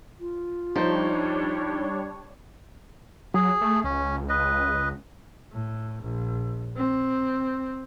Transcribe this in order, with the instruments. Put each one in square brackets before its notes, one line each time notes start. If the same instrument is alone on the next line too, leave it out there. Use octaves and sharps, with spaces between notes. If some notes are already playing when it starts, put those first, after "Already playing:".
[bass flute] F4
[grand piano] F3 C5 [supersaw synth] G3 D4 C#5 [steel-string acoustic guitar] D#4
[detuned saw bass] F#3 [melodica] G#4
[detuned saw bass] A3
[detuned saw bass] C#2 [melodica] C#4
[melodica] B4 D#5
[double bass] A2
A#1
C4